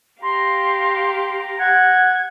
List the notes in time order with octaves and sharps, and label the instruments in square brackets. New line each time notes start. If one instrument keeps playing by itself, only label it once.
[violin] G4 F5 [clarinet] A#5 [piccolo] C6
[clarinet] F#5 [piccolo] G#6